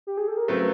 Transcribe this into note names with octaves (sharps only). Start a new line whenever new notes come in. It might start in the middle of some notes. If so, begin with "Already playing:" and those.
G4
G#4
A4
A#4
C#3 F#3 A3 C4 B4